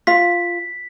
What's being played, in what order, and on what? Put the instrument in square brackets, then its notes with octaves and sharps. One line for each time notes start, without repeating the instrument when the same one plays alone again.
[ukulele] F4 F5 [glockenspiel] B6